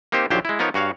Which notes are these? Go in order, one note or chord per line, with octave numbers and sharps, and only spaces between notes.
A#3 C4 D#4 G4 C5
A#1 D#2 A#2 F#3 G4 C5
G#3 E4
F3 B3 D#4 A#4 C#5
G2 F#4 C#5 F5